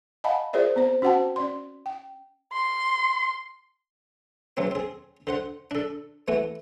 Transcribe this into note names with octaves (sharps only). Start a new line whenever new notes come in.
D#5 F5 F#5 G#5 A5 B5
F4 G#4 A#4 C5 D5 E5
B3 C4 C5
C#4 F#4 C5 F#5 G5 A5
C#4 D5 C6
G5
C6
C#2 B2 F#3 C4
C4 G#4
D3 C5 F#5
D4 A4
E3 A3 B3 F#4